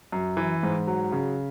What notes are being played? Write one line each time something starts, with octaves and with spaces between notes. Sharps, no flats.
F#2
E3
G#2
F#3
C#3